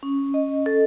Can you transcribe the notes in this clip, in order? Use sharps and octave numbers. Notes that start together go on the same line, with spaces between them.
C#4
D#5
A4